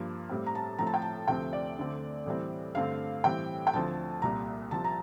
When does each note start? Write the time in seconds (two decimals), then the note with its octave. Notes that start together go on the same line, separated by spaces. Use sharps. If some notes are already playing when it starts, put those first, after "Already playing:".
Already playing: G2 F3 A#3
0.29 A2 G3 C4
0.46 A#5
0.55 A5
0.79 A2 F3 C4 A#5
0.87 A5
0.94 G5
1.02 A5
1.28 D2 C3 F3 A3 C4 G5
1.53 D5
1.78 D2 D3 A3 C4
2.26 A2 E3 G3 C4
2.75 G2 D3 A3 C4 F5
3.24 A2 E3 G3 C4 G5
3.67 G5
3.74 D2 D3 F3 C4 A5
4.22 C2 A#2 G3 A#5
4.71 C2 C3 F3 C4 A5
4.85 A#5